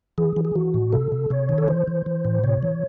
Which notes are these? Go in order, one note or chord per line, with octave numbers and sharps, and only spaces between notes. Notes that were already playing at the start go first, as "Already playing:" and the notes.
E3 G#4
E3
G#4
E3 F#4
A2
C3 A4
C3
C3 C#5
D#3
A4
E3 C5
E3
E3
A2
C3 C#5
E3